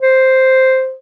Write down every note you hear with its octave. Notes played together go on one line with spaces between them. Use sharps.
C5